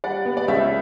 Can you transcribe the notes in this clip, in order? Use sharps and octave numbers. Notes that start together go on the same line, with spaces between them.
G3 D5 F#5
B3
D5
C#2 C#5 E5